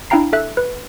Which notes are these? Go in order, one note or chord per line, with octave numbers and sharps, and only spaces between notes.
D4 E4 F5 G5 A#5 C7
A4 E5 F#6
B4